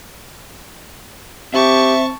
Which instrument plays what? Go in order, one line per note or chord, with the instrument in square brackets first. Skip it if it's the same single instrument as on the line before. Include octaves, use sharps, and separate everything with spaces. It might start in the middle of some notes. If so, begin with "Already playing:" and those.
[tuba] C4 [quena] G4 [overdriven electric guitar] E5 [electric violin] A5 C#6